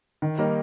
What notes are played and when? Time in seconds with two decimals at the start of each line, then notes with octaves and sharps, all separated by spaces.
0.22 D#3
0.39 G3 A#3 D#4 A#4